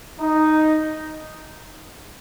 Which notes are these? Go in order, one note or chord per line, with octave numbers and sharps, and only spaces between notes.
D#4